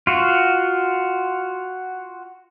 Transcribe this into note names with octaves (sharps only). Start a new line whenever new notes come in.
F4 F#4